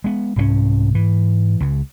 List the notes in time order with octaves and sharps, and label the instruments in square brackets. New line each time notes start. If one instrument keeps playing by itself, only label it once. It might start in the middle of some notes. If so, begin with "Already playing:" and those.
[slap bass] G#3 B3
[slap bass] C2 E3 C#4 [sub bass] G#2
[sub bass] G#2 [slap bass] E3
[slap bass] C#2 C#3